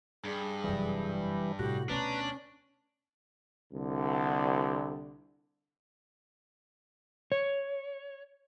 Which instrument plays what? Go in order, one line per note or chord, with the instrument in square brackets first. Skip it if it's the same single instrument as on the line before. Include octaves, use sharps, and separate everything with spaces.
[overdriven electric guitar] G2 [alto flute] G#4
[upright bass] F1 F#2 [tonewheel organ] E3 G3
[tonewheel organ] A2 F#4 [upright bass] C3 [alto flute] G4
[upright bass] D2 B2 [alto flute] C#4 [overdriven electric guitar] D4 [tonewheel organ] B4 A#5
[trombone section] C2 D3
[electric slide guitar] C#5